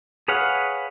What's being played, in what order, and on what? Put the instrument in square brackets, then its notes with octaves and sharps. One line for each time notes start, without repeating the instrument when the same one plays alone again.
[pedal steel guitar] G#4 B4 C#5 F5 F#5